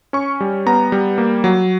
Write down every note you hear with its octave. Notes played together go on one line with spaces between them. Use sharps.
C#4 C#6
G3
B3 A#5
G3
A#3
F#3